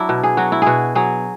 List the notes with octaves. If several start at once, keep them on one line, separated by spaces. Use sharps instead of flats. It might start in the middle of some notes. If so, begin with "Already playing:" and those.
Already playing: F#3 D4 E4
B2
G#4
F#3 F#4
E4
B2 F#4 G#4
F#3 G#4